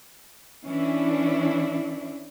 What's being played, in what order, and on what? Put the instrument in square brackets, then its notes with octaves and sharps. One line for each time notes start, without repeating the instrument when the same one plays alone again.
[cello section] E3 C#4 D4 E4